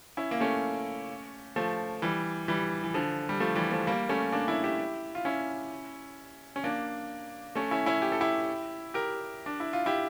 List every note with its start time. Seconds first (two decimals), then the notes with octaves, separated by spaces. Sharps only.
0.17 C#4 E4
0.31 A#3
0.41 A3 C#4
1.56 F3 A3
2.02 E3 G3
2.48 E3 G3
2.84 E3
2.94 D3 F3
3.29 G3
3.40 F3 A3
3.55 E3 G3
3.71 F3 A3
3.87 G3 A#3
4.09 A3 C#4
4.32 A#3 D4
4.48 C#4 E4
4.64 E4 G4
5.15 F4
5.25 C#4 E4
6.56 C#4
6.64 A#3 D4
7.55 A3 C#4
7.71 C#4 E4
7.86 C#4 E4
8.02 G4
8.12 A4
8.21 E4 G4
8.94 G4 A#4
9.46 D4
9.60 E4
9.73 F4
9.86 E4 G4